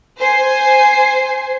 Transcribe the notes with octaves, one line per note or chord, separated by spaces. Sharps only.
C5 G#5 C7